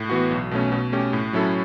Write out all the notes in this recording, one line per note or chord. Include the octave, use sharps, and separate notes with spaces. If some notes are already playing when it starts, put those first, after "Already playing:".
Already playing: A2
E3 B3 F#4
B1
B2 A3 C#4
B2
A3 C#4 G4
A2
F#3 C#4 E4 A4